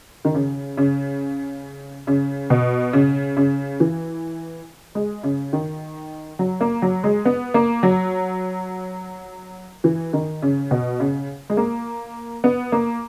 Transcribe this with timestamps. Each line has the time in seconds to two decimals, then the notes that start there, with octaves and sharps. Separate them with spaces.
0.25 D#3
0.34 C#3
0.77 C#3
2.07 C#3
2.50 B2
2.93 C#3
3.37 C#3
3.80 E3
4.95 G#3
5.23 C#3
5.53 D#3
6.39 F#3
6.61 A#3
6.82 F#3
7.04 G#3
7.25 B3
7.54 A#3
7.83 F#3
9.84 E3
10.13 D#3
10.42 C#3
10.71 B2
11.00 C#3
11.50 G#3
11.57 A#3
12.44 B3
12.72 A#3